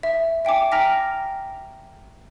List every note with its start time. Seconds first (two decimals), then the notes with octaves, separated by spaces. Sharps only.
0.03 E5
0.45 E5 G5 G#5 D6
0.72 G5 A#5 F6 A#6 B6